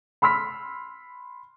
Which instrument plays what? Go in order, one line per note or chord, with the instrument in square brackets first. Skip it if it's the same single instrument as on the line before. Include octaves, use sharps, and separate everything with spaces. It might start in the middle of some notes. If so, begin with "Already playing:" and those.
[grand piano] B5 C6 E6 F6 B6